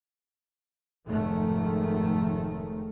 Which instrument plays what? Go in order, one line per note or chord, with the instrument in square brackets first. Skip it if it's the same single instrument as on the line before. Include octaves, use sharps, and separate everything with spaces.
[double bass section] F1 G#2 D#3 A3